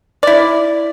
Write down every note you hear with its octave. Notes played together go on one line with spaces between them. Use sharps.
E4 D5